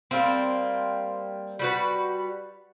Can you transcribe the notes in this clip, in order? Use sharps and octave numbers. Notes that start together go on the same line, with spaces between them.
G3 A#3 C4
G3 F#4 B4